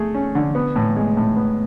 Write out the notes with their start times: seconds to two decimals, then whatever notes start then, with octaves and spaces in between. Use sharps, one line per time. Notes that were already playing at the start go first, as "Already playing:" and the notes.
Already playing: A3 G#4
0.14 C#4
0.35 D3
0.55 B3
0.76 A2
0.97 G#3
1.17 A2
1.36 B3